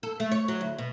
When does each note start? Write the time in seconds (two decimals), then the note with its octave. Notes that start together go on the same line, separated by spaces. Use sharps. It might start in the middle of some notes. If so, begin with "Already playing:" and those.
0.03 A4
0.20 A3
0.32 C#5
0.48 F#3
0.61 D2
0.79 B2